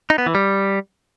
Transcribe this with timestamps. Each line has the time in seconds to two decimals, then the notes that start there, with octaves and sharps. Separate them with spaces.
0.10 D#4
0.18 B3
0.26 E3
0.35 G3